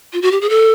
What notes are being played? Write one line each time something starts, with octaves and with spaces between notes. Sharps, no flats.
F4
F#4
G4
G#4
A4